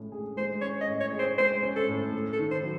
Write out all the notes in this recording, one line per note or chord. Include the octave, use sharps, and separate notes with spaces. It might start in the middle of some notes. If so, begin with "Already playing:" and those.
Already playing: A2 G#3 C#4
G#4
G#3 C5
C#4 C#5
D#5
A2
C#5
G#4
C5
G#3 C5
C#4
A4
A2
A3
A4
D#3
C5
F#3